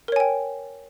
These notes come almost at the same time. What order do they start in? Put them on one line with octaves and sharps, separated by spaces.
A#4 C#5 G#5 G5